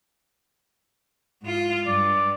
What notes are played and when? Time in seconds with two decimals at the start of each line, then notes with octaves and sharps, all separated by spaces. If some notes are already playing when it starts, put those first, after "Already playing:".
1.42 G#2 F4
1.86 G2 D5